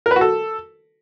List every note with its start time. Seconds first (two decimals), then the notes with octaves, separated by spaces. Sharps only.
0.06 A#4
0.11 B4
0.16 F#4
0.21 A4